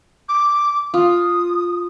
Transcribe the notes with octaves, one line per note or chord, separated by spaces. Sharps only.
D6
F4 D#6